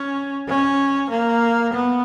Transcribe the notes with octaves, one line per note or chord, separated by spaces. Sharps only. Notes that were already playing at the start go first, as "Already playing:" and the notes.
Already playing: C#4
C#4
A#3
B3